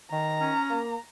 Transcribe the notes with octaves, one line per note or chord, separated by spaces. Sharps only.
D#3 A#5
C#4
A#3